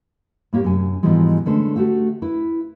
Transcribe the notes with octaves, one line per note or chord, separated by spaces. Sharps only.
A2 A#3 G4 C#5
F#2 C3 C#4 G#5
G#2 B2 E3 F3 G3 G#3
D3 G#3 A3 C#4 B4 C5
A3 F#4 G4 E5
E4 B4